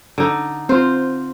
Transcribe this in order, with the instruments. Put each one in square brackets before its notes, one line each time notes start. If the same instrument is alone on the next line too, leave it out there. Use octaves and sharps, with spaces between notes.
[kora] D3 D#4
[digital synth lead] C4 [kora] F4 C5